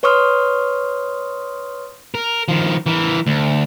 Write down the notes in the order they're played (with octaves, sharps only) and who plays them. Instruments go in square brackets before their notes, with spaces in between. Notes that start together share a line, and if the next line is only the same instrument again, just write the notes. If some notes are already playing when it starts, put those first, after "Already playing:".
[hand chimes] B4 C#5 C6 C#6 D#6 F6
[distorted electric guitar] A#4
D#3 F3
E3 A#4
D2